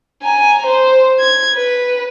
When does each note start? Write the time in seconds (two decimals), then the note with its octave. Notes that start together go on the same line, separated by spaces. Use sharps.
0.23 G#5 A#5
0.66 C5
1.19 G#6
1.54 B4